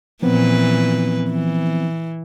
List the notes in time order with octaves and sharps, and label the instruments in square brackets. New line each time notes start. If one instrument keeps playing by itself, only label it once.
[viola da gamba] A#2 E3 B4 [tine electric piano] F3 B3 C4
[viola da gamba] E3